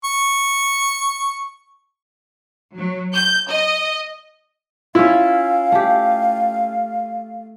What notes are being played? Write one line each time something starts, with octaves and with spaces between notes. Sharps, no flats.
C#6
F#3
G6
D#5
C#4 E4 F4 F5
A3 G4